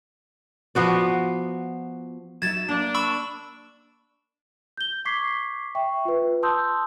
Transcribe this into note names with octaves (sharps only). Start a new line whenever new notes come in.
F3 B3 F#4 D5
F#3 D#4 E5 G#6 A6 E7
A#3 D4 A5
B5 C#6 E6 E7
G6 G7
C#6 D6 G#6 B6 C7
E5 G5 C#6
F4 B4
A5 C6 D#6 E6 G6